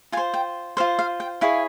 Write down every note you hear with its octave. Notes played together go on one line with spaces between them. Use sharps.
F4 C5 G#5
G5
F4 C5 F5
F5
G5
E4 G#4 C#5 F5